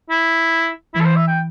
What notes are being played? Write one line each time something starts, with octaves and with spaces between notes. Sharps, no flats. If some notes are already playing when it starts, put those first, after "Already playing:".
E4
E3 E4
A4
C5
E5
G5